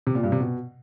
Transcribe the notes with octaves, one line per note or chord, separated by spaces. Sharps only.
C3
A#2
G2
C3
B2